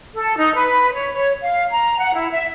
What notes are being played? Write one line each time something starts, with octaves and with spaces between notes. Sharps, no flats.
A4
D#4
B4
C#5
C#5
F5
A#5
F#5
E4
E5